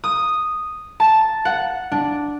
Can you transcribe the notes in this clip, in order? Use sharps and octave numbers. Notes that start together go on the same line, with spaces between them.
D#6
A5
F#5
D4